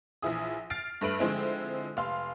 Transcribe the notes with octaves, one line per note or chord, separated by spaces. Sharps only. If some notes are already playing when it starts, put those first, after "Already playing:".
A#1 E3 F3 E4 G#4 D#6
F6 A6 C7 D7
G2 A3 B4 D7 F#7
D3 F3 G#3 C4 E4
F1 F5 C6